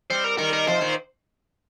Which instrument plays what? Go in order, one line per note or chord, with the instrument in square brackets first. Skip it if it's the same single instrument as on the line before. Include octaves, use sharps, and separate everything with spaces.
[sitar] G3 C4 [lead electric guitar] C5
[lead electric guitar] A#4
[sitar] D#3 G3 [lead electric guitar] A#4
[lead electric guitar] A#4
[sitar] C3 F3 [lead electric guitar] C5
[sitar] A#2 D#3